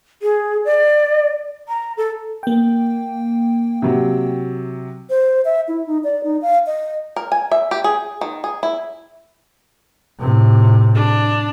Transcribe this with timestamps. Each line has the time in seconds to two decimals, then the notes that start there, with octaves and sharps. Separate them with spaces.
0.22 G#4
0.65 D5
1.69 A#5
1.97 A4
2.43 A#3 G5
3.82 C3 F#3
5.10 C5
5.45 E5
5.68 E4
5.87 D#4
6.04 D5
6.24 D#4
6.42 F5
6.67 D#5
7.16 A#4
7.32 G#5
7.51 E5
7.71 G4
7.84 G#4
8.21 D#3
8.44 G#4
8.63 E4
10.20 A2 C3
10.95 D4